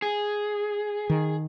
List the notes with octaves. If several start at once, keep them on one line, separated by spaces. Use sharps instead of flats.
G#4
D#3